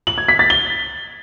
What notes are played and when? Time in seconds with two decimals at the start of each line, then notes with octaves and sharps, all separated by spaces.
0.07 F#7
0.18 G#6
0.28 B6
0.39 A6
0.50 G7